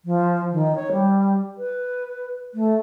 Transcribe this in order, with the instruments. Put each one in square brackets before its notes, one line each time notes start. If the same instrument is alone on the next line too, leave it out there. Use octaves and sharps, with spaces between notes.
[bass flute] F3
D#3
C#5
G3
B4
A3